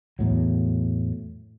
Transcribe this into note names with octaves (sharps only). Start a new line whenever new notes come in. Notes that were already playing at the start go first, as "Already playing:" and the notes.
E2 A2 F#3